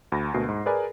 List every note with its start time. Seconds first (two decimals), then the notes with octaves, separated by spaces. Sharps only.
0.12 D2 B5 A#6
0.34 D2 B2 A#3 C7
0.49 G#2
0.66 G#4 A#4 B4 D5 G#5